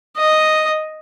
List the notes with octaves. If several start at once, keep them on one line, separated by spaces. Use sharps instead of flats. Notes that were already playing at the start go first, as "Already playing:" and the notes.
D#5